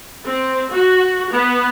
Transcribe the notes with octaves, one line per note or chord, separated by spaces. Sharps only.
C4
F#4
B3